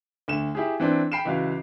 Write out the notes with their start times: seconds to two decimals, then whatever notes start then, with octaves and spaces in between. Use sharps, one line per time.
0.28 D2 E7
0.55 E4 G4 G#4
0.80 E3 C4 D4
1.12 G5 B5 C7 D7 E7
1.25 C#2 E3 F#4 F5